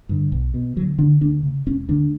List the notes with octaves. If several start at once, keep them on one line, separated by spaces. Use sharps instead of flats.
G2 D3
B1
B2
D2 F#3
D3 D4
D2 D4
C#3
E1 C#4
D2 D3 D4